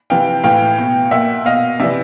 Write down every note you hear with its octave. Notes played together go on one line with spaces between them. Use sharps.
C3 E3 F5 G5
A2 E3 F5 G5
B2
A#2 E5 F#5
B2 D#5 F5
C3 E3 D5 E5